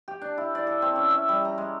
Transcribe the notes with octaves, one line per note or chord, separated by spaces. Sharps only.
G4
D4
E4
D5
A4
C4
C#4
E5
G3
A#5
G#3